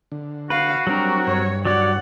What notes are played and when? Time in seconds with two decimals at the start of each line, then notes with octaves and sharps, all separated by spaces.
0.12 D3
0.50 F#4 B4 F5
0.87 F#3 G3 C4 D4 A#4
1.27 G2 C#5
1.65 F#3 F#4 C#5 D5 F#5